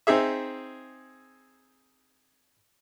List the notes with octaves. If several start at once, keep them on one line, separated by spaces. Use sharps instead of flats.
C4 D#4 G#4 E5